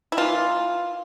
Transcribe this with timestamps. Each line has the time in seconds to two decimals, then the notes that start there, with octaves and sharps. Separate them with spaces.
0.12 E4
0.17 E3 A#3 F4